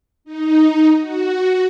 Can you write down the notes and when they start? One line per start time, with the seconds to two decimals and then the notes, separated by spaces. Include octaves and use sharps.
0.25 D#4
1.00 F#4